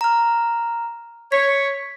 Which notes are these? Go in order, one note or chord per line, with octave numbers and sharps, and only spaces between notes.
A#5 F6
C#5 B6